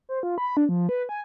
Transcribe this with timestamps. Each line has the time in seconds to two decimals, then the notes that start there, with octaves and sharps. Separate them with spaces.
0.09 C5
0.23 F4
0.38 B5
0.57 D4
0.69 F3
0.89 B4
1.09 G#5